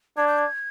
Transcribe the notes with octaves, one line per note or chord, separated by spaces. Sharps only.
D4 G#6
G6
G#6